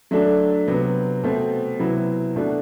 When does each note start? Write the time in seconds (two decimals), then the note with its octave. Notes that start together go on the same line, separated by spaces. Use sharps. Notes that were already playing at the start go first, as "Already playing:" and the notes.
0.11 F#3 A3 D4 A4
0.67 C3 F#3 B3
1.24 B2 A3 C4
1.80 C3 F#3 B3 E4
2.36 B2 A3 D4 F#4